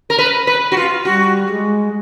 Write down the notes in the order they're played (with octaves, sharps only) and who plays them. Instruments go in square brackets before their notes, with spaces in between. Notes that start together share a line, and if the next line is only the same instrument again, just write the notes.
[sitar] A#4
B4
B4
F#4
F4
[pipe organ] G3 [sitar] F#4
[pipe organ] G#3